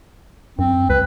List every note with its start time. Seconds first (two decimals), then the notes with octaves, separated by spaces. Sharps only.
0.59 F#2 C4
0.89 C#2 B4